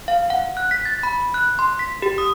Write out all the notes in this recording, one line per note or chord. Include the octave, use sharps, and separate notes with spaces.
F5
F#5
F#6
B6
A6
B5
F#6
C6
B6
G4
D#6